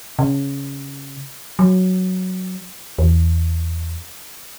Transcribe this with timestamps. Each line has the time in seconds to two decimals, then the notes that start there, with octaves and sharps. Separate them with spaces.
0.19 C#3
1.59 F#3
2.98 E2